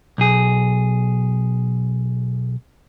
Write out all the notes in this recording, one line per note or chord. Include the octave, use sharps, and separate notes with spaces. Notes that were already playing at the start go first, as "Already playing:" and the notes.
B1 G#4